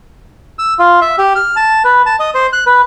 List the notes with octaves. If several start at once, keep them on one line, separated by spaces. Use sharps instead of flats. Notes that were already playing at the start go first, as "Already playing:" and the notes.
E6
F4
E5
G4
F6
A5
B4
A5
D#5
C5
F#6
B4